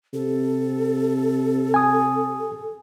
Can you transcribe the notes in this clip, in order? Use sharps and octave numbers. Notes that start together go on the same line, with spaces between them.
C3 A4
G#5 D#6